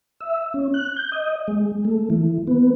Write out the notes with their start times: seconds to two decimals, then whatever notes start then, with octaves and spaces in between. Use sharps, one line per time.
0.21 E5
0.54 C#4
0.74 F#6
0.96 G6
1.12 D#5
1.48 G#3
1.85 A3
2.10 E3
2.47 B3